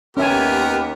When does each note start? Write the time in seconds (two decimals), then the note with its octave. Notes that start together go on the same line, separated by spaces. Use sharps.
0.17 D#2 B3 C#4 G4 A#4 E5 G#5